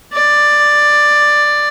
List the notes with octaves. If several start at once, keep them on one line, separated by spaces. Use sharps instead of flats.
D5